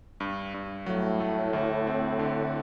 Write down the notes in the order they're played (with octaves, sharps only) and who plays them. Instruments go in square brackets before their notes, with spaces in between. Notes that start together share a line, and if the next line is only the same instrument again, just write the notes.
[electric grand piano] G2
G2
[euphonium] A2 [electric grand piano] F#3
[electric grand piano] A3
D2
C4
D3